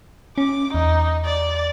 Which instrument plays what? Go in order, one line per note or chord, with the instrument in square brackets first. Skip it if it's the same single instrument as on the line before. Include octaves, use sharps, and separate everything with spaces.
[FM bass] C#4 [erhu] D6
[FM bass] E2 [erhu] D#4
[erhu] D5